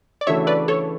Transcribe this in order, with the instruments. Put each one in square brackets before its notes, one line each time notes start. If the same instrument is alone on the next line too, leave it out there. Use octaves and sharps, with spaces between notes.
[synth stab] D5
[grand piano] C#3 E3 A3 D4 F#4 [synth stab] C#5 E5
[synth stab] B4 D5
A4 C#5